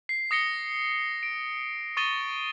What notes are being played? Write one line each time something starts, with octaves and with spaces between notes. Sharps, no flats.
C7
D#6 A#6 C#7 G7
D7
C#6 D#6 A6 D#7 G7